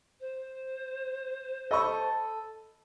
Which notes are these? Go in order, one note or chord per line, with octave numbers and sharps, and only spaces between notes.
C5
A4 D#5 B5 C#6